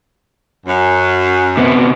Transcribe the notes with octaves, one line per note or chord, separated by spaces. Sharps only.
F#2
C3 B3